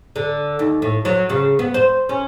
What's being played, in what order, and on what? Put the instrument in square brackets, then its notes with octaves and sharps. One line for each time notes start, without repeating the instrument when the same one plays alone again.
[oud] D3
D#2
A2
F#3
C#3
B3
C5
C#4